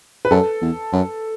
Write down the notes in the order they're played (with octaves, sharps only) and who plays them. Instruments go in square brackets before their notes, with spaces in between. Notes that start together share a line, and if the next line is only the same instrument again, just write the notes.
[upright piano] B4
[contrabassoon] F#2 [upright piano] A4
[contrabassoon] E2
F#2